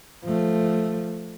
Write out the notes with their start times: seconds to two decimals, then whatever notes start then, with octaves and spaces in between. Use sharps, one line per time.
0.25 F3 A3